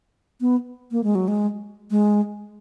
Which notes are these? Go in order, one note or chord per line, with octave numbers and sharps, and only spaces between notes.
B3
A#3
G#3
F#3
G#3
G#3